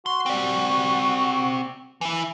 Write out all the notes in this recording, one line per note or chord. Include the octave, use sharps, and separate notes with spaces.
F#4 C6
C4 D5
E3 E4